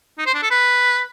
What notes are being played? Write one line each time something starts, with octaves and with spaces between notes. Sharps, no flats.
D#4
C5
D4
A4
B4